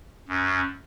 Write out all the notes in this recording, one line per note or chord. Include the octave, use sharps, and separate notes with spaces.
F#2